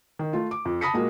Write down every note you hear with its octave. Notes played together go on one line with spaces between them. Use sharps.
D#3
A3 F4
D6
F2
A5 B5 D#6 A#6 B6 C#7
A#2 G#3 A#3 F#4